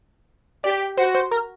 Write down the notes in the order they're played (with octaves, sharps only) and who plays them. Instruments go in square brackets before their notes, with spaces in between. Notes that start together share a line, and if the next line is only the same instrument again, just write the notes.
[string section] G4 [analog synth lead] D5
[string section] F#4 [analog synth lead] C5
[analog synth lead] C5
A#4